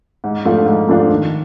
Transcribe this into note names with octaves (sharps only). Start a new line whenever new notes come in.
G#2
F3 A3 D4 F4
G#2
F3 A3 D4 F4
D#3